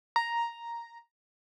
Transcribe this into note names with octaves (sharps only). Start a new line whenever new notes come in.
A#5